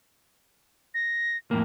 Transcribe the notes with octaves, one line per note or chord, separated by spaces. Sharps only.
A#6
F2 A2 A#3